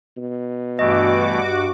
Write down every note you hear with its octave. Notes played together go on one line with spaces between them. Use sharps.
B2
G2 E3 A3 F#4 D#5 D6